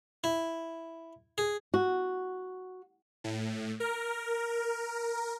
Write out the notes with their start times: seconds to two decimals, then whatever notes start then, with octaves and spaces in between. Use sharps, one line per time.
0.24 E4
1.38 G#4
1.74 F#4
3.24 A2
3.80 A#4